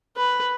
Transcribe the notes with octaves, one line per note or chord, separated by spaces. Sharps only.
B4